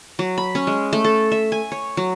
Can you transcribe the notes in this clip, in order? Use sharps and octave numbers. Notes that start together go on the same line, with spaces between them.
F#3
B5
C#4
G#3
A3
A4
E5
G#5
C#5
F#3